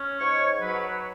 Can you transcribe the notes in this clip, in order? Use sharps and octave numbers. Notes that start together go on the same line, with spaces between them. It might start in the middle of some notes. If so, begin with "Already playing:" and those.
Already playing: C#4
G#2 C#5
F#3 B4